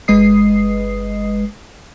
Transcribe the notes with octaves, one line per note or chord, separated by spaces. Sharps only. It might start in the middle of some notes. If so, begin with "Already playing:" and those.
G1 G#3 B4 D#5 D#6 C7